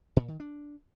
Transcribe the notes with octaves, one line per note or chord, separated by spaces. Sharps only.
A#2
D#3
D4